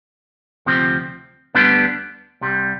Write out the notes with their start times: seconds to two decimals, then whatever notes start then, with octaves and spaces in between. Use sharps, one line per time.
0.66 D2 C3 F3 C4
1.55 D2 D3 G3 B3 D4
2.41 C2 C3 G3